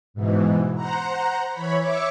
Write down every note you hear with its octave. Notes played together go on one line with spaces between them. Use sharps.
G#2 B2 E3
C5 F#5 A#5
E3 C#5 B5
C#5 E5 C#6 D6